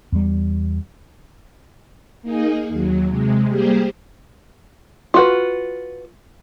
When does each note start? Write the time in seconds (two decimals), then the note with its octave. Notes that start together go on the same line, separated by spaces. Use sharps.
0.12 E2 G3
2.22 A#3 D#4 G#4 D#5
2.68 D#2 F#3
3.08 C3 G#3
3.48 G3 A#3 G4 G#4 C5
5.14 F4 F#4 B4